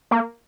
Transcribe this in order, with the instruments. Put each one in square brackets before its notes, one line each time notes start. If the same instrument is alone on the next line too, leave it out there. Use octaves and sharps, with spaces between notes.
[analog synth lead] A#3